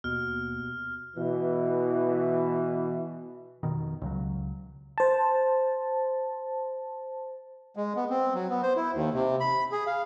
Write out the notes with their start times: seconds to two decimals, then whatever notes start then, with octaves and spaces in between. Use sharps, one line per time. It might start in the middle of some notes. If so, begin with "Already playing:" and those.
0.04 D#2 B2 F6
1.17 B2 E3
3.63 F1 B2 D#3
4.02 C#2 C#3 F#3
4.98 C5 A5
7.76 G#3
7.96 B3
8.10 C4
8.34 F#3
8.49 B3
8.63 C5
8.76 E4
8.94 D#2
9.14 C3
9.40 B5
9.72 G#4
9.87 F5